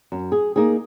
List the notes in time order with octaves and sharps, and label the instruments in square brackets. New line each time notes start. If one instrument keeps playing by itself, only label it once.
[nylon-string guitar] F#2
G#4
A#3 D#4 G#4